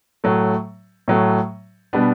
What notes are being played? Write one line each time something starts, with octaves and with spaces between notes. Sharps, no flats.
A2 F#3 A3
A2 F#3 A3
B2 G3 B3 D4